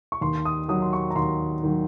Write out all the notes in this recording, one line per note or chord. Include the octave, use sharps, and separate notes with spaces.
C#6
D#2 C6
D#6
D#3 F#3 D#6
C6
C#6
A#5
D#2 C6
D#3 F#3